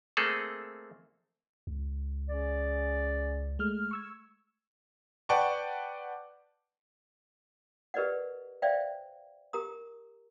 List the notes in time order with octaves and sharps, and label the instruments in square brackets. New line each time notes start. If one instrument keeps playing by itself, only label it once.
[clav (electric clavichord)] A3 A#3 C4 G#4 A4
[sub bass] C#2
[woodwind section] C#4 G#4 D5
[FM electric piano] G#3 A3 F6
C#6 E6 G#6
[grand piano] B4 D5 F#5 G5 A5 C#6
[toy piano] G4 A#4 B4 D5 D#5 F#5
C5 D5 E5 F5 G5
G4 A#4 A#5 D#6